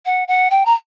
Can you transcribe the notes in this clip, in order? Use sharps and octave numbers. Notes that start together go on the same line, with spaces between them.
F#5
F#5
G5
A#5